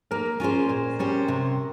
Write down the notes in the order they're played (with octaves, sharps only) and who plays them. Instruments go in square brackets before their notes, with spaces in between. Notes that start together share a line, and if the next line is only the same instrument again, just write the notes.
[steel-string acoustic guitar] A#3 [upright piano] A#4
[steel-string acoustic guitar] C#4 F4 G#4 C5
A#2
G3 C#4 G4 C5
C3